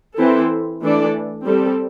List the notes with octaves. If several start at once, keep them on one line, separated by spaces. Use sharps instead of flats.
E3 C4 E4 A4
E3 A3 D4 A4 D5
G3 C4 A4